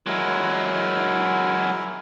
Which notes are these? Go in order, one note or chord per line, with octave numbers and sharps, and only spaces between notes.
F#3 G#3 E4 A#4